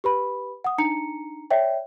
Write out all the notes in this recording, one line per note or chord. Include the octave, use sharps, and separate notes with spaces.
G4 B4 B5
F#5 D#6
D4 D#4 A#5 C#7
C#5 D5 E5 G5